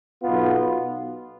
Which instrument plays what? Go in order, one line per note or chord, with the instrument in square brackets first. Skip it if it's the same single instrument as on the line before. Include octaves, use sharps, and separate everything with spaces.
[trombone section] B1 B2 B3 F4